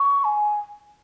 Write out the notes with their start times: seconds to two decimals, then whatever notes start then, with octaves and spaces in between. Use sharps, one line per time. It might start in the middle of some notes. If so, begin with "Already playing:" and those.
Already playing: C#6
0.24 G#5